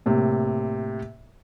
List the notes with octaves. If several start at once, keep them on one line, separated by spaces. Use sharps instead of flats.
A2 C3 A#3